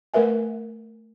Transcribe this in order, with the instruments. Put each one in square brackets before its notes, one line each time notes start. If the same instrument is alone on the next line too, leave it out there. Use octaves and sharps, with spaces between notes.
[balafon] A3 A#4 B4 E5 G#5